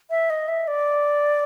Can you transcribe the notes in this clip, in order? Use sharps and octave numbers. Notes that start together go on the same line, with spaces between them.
E5
D#5
E5
D5